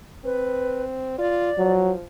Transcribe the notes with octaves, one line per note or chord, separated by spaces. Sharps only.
C4 B4
F4 D5
F3 F#3